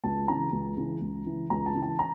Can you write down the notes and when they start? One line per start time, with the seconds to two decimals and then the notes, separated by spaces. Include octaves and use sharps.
0.04 C#2 A5
0.28 C#3 E3 A#5
0.52 C#2
0.77 C#3 E3
1.01 C#2
1.26 C#3 E3
1.50 C#2 A#5
1.66 A5
1.75 C#3 E3
1.82 A5
1.99 A#5